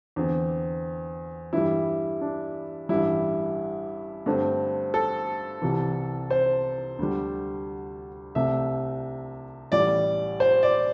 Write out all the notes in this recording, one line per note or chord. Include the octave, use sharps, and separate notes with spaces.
E2 D3 C4
G2 E3 G3 E4
D4
A1 G2 G3 E4
G2 D3 A3 C4
A4
C2 C3 E3
C5
D2 D3 G3
C2 C3 A3 E5
A1 A2 G3 D5
C5
D5